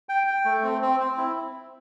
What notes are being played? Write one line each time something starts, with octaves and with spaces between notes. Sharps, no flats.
G5
G5
A3
C4
C4
C4
E4